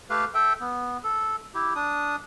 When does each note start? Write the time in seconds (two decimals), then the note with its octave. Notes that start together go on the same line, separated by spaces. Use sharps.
0.10 A3 G4 B4 F5
0.34 A4 E5 G5
0.61 B3
1.04 A4
1.55 E4 G4
1.75 D4 D#6